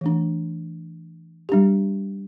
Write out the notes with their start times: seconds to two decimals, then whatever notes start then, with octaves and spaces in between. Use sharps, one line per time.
0.01 E3 A3 D4
1.49 G3 D4 G4